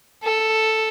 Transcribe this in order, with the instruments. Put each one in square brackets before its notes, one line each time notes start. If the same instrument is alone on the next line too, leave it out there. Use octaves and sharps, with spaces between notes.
[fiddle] A4